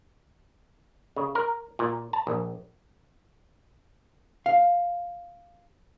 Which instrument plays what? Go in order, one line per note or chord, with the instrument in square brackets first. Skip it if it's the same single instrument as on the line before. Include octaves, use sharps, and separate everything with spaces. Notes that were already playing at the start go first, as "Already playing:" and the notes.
[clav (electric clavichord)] C#3
A#4
A#2
A5
A#1
[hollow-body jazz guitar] F5